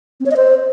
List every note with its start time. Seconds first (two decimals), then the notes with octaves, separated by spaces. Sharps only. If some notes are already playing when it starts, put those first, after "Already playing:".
0.20 C4
0.26 C#5
0.31 D#5
0.36 C5